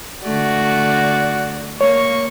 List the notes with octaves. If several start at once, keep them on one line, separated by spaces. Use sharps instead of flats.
D3 A3 F#4 D5
A#3 C#5 C#6